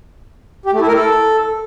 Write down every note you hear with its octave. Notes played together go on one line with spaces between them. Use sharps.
G4
A3
E4
A#4
A4